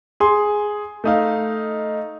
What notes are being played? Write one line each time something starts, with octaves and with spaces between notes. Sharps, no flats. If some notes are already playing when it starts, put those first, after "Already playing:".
G#4 C6
A3 D#4 F5